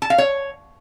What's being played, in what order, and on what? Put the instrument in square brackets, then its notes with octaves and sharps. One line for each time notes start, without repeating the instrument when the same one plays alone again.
[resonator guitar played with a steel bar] A5
F5
C#5